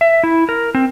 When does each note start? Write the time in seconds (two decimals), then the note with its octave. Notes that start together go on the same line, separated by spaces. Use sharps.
0.01 E5
0.24 E4
0.49 A#4
0.75 C4